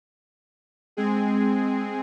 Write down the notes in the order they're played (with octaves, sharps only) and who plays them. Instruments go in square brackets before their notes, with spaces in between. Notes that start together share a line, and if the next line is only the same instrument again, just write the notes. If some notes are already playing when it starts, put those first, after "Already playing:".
[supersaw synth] G#3 C4 G#4